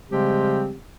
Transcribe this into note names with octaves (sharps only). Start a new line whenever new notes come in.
C#3 F3 G3 G#3 C4 G4